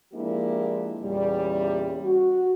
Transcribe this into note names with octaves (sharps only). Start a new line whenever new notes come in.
F3 G#3 A#3 D4 E4 G4
E2 A#2 C#3 G3
F#4